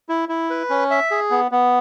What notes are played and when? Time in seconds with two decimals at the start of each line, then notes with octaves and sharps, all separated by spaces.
0.09 E4
0.29 E4
0.50 B4
0.70 C#4
0.90 E5
1.11 G#4
1.30 B3
1.51 B3